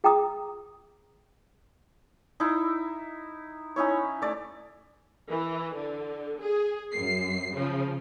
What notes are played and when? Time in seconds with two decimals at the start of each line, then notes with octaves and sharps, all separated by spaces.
0.04 G#4 G5 A#5 D6 D#6
2.40 D#4 E4
3.76 C#4 D#4 E4 C#5
4.22 A3 D5
5.29 E3
5.74 D3
6.40 G#4
6.93 F#2 C7
7.53 C#3 F3